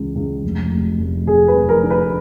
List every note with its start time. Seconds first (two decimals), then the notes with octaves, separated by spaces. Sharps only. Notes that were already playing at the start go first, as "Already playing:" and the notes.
Already playing: C#2 C#3 E3
0.15 C#2
0.44 F1
0.72 F1
1.00 F1
1.27 F2 G#4
1.48 B4
1.55 F1
1.69 A#4
1.83 D3
1.90 B4